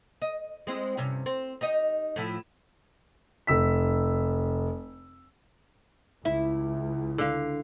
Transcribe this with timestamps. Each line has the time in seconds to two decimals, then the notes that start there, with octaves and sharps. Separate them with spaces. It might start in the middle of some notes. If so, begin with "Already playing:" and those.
0.22 D#5
0.67 G#3 C4 E4
0.97 G2 C3 C#4
1.26 C4
1.61 D#4 G4 D#5
2.16 A2 F3 E4
3.47 F1 E6 B6
6.25 C#2 E4
7.18 D3 F5